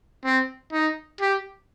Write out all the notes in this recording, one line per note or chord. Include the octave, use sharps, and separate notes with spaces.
C4
D#4
G4